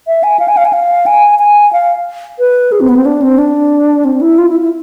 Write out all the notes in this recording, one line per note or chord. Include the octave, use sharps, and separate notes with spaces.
E5
G#5
F5
G#5
F5
G#5
F5
G#5
G#5
F5
B4
G#4
C4
B3
C4
D4
C4
D4
C4
E4
F4
E4
E4